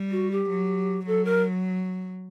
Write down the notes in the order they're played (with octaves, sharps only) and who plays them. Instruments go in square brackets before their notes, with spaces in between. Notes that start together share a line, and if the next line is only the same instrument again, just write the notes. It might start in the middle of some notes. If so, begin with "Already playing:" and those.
Already playing: [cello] G3
[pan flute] F#4
G4
[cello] F#3
[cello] F#3 [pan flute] A4
[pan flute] A#4